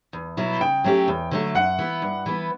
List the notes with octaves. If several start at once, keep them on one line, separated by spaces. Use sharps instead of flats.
E2
B2 F#3 B3 E4
C#3 G5
F#3 A3 C#4 G4
E2
D3 F#3 A3
F#2 F#5
E3 B3
G2
E3 B3